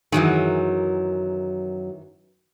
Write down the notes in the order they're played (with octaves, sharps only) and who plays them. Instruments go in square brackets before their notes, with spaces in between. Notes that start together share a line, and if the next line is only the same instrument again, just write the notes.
[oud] F#2 F#3 G#4 [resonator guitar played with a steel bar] D#3 E3